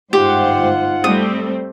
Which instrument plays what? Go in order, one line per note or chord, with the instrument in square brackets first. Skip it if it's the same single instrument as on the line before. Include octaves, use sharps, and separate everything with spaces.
[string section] G1 G#2 C5 [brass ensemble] D#4 F4 F#5 [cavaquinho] G4
[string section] G3 A3 C4 [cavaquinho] D#6